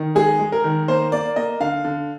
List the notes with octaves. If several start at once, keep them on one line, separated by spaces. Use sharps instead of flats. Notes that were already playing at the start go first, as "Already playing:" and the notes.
Already playing: D#3
G#3 G#4
G#3
A#4
D#3
A#3 C5
A#3 D5
A#3 D#5
D3 F5
D3